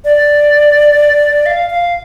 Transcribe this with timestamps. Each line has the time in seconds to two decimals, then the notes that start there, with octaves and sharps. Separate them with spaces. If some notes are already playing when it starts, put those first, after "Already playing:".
0.05 D5
1.46 F5
1.70 F5